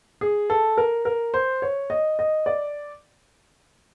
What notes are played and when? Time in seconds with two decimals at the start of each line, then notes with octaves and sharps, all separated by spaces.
0.21 G#4
0.50 A4
0.77 A#4
1.05 A#4
1.34 C5
1.62 C#5
1.90 D#5
2.19 D#5
2.46 D5